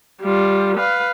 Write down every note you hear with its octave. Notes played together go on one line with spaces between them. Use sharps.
G3 F4
B4 F5